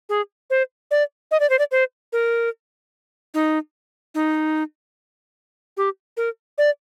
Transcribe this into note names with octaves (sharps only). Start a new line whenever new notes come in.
G#4
C5
D5
D#5
D5
C5
D5
C5
A#4
D#4
D#4
G4
A#4
D5